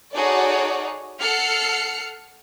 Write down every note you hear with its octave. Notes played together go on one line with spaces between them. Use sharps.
D#4 F#4 G#4 A4 C#5 D5
A4 F#5 F6 C7 C#7